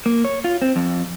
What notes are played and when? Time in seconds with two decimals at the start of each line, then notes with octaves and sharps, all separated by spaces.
0.06 A#3
0.25 C#5
0.44 F4
0.62 C4
0.76 F2